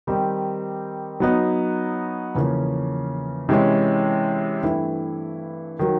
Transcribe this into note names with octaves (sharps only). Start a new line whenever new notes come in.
D#3 G3 C4 D#4 G4
F#3 B3 D#4
E2 C#3 F3 A#3 C#4
C3 E3 G#3 C#4
G2 E3 A3 C4 E4
D#3 F#3